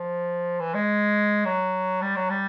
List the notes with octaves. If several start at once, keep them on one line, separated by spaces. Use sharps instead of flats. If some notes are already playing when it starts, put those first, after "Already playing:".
Already playing: F3
E3
G#3
F#3
G3
F#3
G3